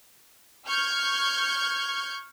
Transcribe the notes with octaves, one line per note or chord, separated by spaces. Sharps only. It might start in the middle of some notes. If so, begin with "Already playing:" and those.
C#6 F6 G6 G#6